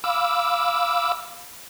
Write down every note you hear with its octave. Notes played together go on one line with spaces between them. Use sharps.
F5 B5 D6 E6